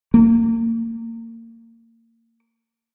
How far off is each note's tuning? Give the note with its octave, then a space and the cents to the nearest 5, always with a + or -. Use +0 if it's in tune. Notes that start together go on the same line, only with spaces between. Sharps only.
A#3 -30